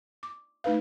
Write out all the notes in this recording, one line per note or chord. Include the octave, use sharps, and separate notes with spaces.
D6
A3 D#4 B4 F5